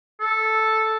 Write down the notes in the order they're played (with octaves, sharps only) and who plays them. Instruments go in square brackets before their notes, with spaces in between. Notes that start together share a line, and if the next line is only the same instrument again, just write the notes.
[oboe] A4